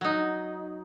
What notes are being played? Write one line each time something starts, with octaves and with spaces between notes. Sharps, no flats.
F#3 D#4